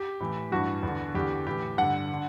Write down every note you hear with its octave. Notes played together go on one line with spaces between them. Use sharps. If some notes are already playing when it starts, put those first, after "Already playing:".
Already playing: G4
A2 E3
G2 E3 F#4
E2
D3
E2 D3 G4
A2 E3 G4
G2 D3 F#5
D3